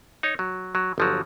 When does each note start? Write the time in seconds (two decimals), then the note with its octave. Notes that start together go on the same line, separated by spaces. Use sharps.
0.23 D#4 C#5
0.39 F#3
0.75 F#3
0.98 G1 F3 F#3